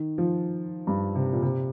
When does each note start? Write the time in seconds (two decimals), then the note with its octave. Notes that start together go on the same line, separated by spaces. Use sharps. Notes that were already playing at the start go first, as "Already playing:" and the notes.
Already playing: D#3
0.18 F3
0.87 G2
1.15 C3
1.33 A#2
1.43 C3